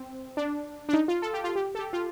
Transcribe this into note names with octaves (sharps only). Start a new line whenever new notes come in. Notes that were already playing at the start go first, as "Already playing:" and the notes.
Already playing: C4
D4
D4
D#4
F4
A4
G4
F4
G4
A4
G4
F4